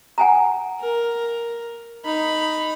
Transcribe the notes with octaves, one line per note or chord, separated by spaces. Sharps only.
F#5 G#5 A#5
A#4
D#4 B5